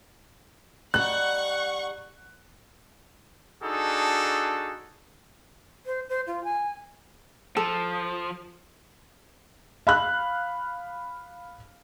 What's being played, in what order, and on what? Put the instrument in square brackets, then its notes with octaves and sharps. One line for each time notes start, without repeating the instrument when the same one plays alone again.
[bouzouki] G3 D#4 [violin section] F#5 C#6 [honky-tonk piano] F#6
[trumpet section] D4 D#4 F#4 G#4 A4
[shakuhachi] C5
C5
F4
G#5
[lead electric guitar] F3 [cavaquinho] A4
[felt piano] F5 B5 F#6